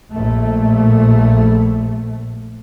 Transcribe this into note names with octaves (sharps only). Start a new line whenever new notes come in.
A#1 A3